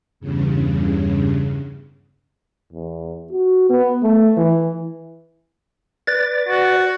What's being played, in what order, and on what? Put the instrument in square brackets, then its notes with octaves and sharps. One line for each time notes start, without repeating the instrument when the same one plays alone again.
[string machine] E2 G2 C#3
[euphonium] E2
F#4
B3
A3
E3
[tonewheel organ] B4 D5 A6
[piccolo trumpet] F#4